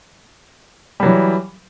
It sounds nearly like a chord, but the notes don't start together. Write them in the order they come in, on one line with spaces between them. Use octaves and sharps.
G3 F#3 E3